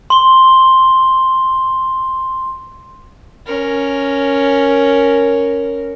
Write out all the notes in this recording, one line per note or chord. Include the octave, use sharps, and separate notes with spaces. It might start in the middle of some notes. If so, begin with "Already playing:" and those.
C6 G7
C#4 A#4